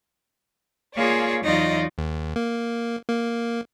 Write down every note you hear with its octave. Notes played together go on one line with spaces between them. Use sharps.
A#3 F4 G#4 C#5 D5
E2 F#3 D#4 F4 D5 D#5
D#2
A#3
A#3